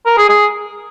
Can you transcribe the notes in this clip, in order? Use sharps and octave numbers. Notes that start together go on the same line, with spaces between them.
A#4
G#4
G#4